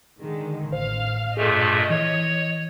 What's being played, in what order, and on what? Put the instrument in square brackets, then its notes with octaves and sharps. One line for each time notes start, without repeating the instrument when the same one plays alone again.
[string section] D3 D#3 G#3
[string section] A1 F5 F6 [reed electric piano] C5
[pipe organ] G2 A#2 A3 [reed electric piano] G#4 A4 [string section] D#5
[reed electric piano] E3 [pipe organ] C#5